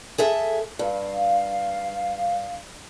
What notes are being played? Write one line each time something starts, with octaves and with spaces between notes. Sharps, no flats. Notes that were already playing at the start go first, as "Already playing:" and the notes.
G#4 A4 E5
G2 F5